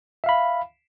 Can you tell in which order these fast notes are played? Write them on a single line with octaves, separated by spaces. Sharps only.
E5 F5 B5